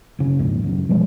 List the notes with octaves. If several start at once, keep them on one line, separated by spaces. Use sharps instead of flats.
F#1 C#3
A#1 D#2 G#2
C#2 F#2
B2 F3 G3 G#3